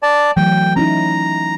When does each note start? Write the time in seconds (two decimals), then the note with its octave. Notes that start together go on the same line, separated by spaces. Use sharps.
0.03 D5 A5
0.37 E3 F#3 A3 G5
0.76 C#4 D#4 E4 A#5